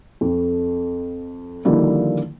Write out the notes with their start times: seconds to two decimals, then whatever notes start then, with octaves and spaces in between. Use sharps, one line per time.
0.21 F2
1.65 D3 D#3 F3 G3 A#3 E4